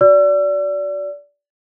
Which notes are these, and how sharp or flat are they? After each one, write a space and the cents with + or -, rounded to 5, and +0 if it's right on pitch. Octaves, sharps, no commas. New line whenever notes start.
F#4 +0 D5 -20 E6 +40